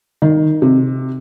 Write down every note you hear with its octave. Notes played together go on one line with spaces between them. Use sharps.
D#3
C3